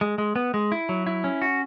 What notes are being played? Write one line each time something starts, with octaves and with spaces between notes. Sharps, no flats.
G#3
G#3
B3
G#3
E4
F#3
E4
C#4
F#4